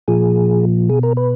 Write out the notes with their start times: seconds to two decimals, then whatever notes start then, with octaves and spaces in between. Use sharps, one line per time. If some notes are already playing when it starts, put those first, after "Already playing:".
0.08 A#2 F3 G#4
0.90 B2 G#4
1.03 A#4
1.17 B4